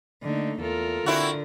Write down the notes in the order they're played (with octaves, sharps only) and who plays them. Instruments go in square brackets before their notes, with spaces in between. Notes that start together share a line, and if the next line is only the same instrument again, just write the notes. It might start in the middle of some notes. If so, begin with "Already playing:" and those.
[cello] D3 A#3 [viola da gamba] A3 D#4
[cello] E2 [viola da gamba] F4 A4 A#4
[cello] D3 [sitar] C4 E4 F#4